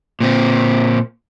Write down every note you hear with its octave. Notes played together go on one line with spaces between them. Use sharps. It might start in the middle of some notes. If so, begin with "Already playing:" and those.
A#2 C4